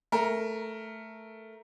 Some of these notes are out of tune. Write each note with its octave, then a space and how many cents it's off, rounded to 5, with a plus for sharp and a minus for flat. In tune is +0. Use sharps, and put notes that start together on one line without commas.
A3 +0 A#4 +0